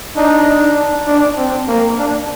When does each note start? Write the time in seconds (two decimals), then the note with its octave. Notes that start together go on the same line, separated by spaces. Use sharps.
0.16 D4 D#4
1.07 D4
1.37 C4
1.68 A#3
1.99 D4